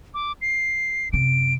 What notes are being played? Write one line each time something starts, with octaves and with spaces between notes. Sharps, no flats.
D6
C7
F#2 C3 D7